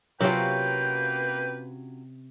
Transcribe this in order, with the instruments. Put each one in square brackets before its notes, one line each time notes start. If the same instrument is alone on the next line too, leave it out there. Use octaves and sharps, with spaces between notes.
[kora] C3 C4 C#4 [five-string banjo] F#3 F4 [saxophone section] A#3 B4 [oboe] G5